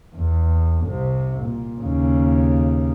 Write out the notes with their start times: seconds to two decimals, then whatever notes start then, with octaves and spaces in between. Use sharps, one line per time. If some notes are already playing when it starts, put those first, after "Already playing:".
0.15 E2
0.85 C2 C3
1.44 A#2
1.81 D#2 C#3